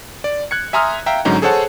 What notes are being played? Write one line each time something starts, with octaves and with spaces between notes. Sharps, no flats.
D5
F#6 G#6 C#7
E5 G#5 A#5 C6 D#6 F6
E5 F5 G5 A#5
G#2 D3 F#3 C#4 D#4 A#5
G#4 A4 C5 C#5 F#5 A5